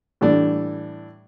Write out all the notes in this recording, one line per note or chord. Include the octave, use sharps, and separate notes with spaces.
A2 E3 G3 D4